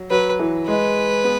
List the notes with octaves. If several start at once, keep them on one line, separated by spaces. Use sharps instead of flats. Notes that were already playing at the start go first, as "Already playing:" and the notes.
Already playing: F#3
F#3 B4
E3
G#3 B4
B3